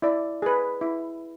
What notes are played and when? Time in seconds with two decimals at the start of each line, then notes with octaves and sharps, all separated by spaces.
0.02 E4 D5
0.42 G#4 B4
0.81 E4